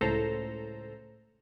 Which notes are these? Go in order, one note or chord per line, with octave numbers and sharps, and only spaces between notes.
C#2 A2 A4 C5 A#5